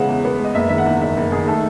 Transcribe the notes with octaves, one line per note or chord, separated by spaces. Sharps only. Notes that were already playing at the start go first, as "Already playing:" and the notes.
Already playing: C#3 E3 G#3 B3 E5 F#5
E2
B3
G#3
D#5
F#1 E5
D#3 E5
F#5
E2
F#1 E5
F#1
D#3 G#4
A3 A4